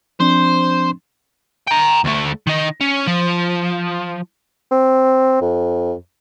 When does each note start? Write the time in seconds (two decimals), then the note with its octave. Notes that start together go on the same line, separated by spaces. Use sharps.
0.20 F3 C4 D4 C5
1.68 G5 A#5
2.05 D2 A3
2.47 D#3 D#4
2.81 C#4
3.07 F3
4.71 C4
5.41 F2